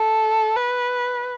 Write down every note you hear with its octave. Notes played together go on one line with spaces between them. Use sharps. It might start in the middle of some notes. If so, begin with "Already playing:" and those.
Already playing: A4
B4